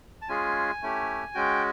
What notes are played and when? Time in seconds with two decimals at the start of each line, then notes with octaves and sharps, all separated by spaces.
0.22 A5
0.28 G#3 C#4 F4 G#4 G#5
0.82 A3 C#4 E4 G4
1.34 G#3 C#4 F#4 G5